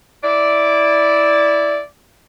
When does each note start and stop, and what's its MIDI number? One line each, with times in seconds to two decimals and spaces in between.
0.23 1.80 64
0.23 1.80 74